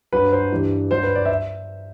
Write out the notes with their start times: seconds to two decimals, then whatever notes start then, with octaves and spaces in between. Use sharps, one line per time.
0.13 G2 F#3 B4
0.32 C5
0.52 G2 E3 G3
0.91 G2 F#3 C5
1.03 B4
1.15 D5
1.25 E5